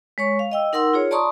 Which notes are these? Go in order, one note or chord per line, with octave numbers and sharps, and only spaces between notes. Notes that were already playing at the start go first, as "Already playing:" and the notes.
G#3 C#5 C#6
F5
D#5 G5 E6
D#4 A#4 F#5 C6 E6
F4 G#4 C#5
D5 A5 A#5 C6 C#6 D#6